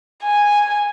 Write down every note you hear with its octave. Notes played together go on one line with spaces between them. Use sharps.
G#5